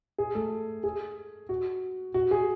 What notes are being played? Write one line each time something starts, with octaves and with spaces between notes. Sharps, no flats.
G#4
A3 A4
G#4
F#4
F#4
G#4